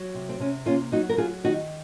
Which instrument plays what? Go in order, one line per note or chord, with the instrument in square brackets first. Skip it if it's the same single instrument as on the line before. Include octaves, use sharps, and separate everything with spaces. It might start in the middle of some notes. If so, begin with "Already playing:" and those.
Already playing: [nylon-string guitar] F#3
C3
C4
C3 C#4
A#3 C#4 F4
F#3 D#4 F#4
A#4
F#3 F4 G#4
D#3 D#4 F#4